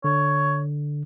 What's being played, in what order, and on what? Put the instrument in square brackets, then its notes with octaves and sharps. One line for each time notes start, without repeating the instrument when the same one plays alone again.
[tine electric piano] D3 [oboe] C#5